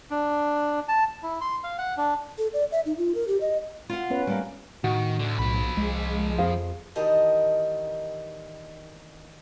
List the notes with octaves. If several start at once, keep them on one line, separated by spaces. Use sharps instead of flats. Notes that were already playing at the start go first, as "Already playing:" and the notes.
D4
A5
E4
C6
F5
F#5
D4
A4
D5
E5
D#4
F4
A#4
G4
D#5
F4 F#5
B3 C#4 B4
G3 A#3
A2 D#3 F#4
D2 D3
B1 F3 B5
C2 G#3
G#3
F2 G#4 C5 F5
D#3 E3 G3 A#4 D#5 A5